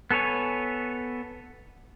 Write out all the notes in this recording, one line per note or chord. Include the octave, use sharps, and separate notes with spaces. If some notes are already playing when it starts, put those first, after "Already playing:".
B3 A4 B4 C#5 G#5